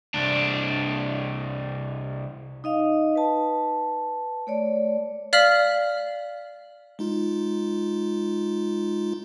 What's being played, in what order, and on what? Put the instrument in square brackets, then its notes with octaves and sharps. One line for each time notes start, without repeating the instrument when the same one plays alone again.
[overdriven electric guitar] C2 D4
[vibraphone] D#4 D#5 F5
B4 A5
A3 C#5 D5
[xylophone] D5 F5 F6 B6 F#7
[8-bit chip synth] G#3 D#4 F4